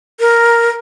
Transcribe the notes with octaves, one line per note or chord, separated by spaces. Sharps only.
A#4